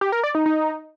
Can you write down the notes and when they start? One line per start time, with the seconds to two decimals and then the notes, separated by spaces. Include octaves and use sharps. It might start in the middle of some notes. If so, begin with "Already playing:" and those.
0.01 G4
0.12 A#4
0.24 D5
0.35 D#4
0.46 D#4